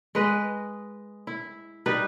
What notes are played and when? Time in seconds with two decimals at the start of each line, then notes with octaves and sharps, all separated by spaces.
0.15 G#3 B4 D#5
1.27 E4
1.86 G3 D#4 B4